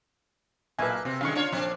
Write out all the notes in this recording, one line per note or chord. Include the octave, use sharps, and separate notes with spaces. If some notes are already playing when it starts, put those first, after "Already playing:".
B1 A#2 A#3 B4 E5 G#5 A5
C3 C4
F#2 D3 D#3 G#3 C#4 F5 C#6
D4 F4 C#5
A#1 C4 D4